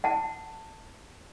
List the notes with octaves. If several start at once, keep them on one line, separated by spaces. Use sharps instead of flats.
F#5 A5